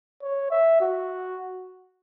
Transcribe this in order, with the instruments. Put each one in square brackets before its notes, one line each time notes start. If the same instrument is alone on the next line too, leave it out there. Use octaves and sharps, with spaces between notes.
[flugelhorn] C#5
E5
F#4